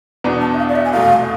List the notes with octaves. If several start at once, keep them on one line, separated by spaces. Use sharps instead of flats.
E2 B2 B3 D4
A5
E5
F5
D5
E5
G#5
F1 E2 B2 A3 F5